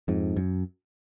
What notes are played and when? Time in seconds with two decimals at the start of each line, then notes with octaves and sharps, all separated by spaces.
0.08 F2 G#2
0.36 F#2